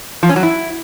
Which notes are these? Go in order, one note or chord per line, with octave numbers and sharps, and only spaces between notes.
F3
C#4
F#3
E4